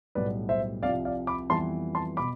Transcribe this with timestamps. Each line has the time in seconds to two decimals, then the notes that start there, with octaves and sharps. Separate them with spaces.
0.15 B1 A2 G3 B3 B4 D5
0.49 C5 E5
0.83 C2 C3 F3 D5 F5
1.05 D5 F5
1.27 B5 D6
1.50 F2 E3 G3 B3 A5 C6
1.95 A5 C6
2.17 B2 B5 D6